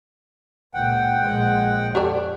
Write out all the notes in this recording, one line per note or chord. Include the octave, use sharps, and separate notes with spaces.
C#2 A#2 F#5 G5
A#1 G#3
F2 G4 A4 D5